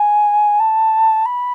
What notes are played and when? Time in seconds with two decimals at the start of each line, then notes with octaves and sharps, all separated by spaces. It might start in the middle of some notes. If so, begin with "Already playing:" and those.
Already playing: G#5
0.59 A5
1.25 B5